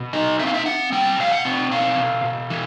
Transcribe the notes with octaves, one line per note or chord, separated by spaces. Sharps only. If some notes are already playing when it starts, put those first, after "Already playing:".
Already playing: B2
D#4 D#5
C4 E5
F5
E5
C4 F#5
G3 G5
B2 F5
F#5
C4
B2 F5
B2
B2
E3